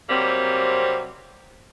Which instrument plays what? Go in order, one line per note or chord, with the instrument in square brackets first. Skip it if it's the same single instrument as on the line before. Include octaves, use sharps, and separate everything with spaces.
[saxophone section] C3 F#3 G3 A#3 C4